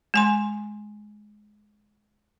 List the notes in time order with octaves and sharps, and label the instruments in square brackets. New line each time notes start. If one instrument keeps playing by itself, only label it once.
[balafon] G#3 G#5 C6